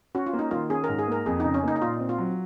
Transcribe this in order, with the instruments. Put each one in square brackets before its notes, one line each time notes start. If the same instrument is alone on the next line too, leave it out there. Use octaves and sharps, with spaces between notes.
[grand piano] C#4 [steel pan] F#4
[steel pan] F4
[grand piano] A#3
[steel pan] D#4
[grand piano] D#3 [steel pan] F4
[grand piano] C#4 [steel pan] G#4
[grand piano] G#2 [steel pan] A#4
[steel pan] G#4
[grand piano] A#3 [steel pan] A#4
[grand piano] F2 [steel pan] G#4
[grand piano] C#3 [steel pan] D#4
[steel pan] C#4
[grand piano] A#3 [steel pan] D#4
[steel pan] D#4
[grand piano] A#2 [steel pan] F4
[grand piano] C4
[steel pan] F4
[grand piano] F#3